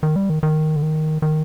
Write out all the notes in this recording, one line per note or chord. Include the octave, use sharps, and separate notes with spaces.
D#3
G3
D#3
D#3
D3
D#3
D#3